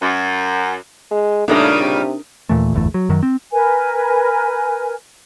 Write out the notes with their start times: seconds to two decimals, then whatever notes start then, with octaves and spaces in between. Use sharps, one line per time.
0.01 F#2
1.11 G#3
1.48 A#2 C#3 G3 A3 D4 D#4 A#4
1.80 C3
2.49 D#2 A#2 E3 A3
2.73 D1 G1 E2 A3
2.94 F#3
3.09 F#2 D#3 F#3
3.23 C4
3.53 A#4 B4 G#5